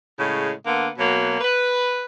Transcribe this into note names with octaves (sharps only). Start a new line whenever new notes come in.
A2 C#3 G#3
D3 A#3 B3
B2 F#3 A#3
B4